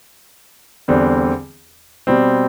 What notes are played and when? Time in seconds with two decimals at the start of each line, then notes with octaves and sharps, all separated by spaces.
0.88 E2 D3 G3 C4
2.07 B2 G3 C4